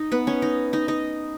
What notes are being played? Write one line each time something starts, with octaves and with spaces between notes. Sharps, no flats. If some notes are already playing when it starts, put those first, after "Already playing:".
Already playing: D#4 D#5
B3 B4
C#4 C#5
D#4 D#5
D#4 D#5
D#4 D#5